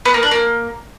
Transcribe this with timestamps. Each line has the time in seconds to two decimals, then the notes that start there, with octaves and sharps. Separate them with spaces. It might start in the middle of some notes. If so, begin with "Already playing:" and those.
0.05 B3
0.14 A#3
0.23 D4
0.31 A#3